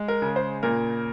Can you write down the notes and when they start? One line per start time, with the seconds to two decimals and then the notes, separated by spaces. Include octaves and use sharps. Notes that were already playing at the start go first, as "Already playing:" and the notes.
Already playing: G#3
0.08 A#4
0.22 C#3
0.36 C5
0.63 A#2 A#4